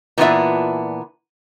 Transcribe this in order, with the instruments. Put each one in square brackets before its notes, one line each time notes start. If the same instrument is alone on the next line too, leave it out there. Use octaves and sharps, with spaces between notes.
[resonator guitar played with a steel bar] A#2 E3 B3 D4 F4 E5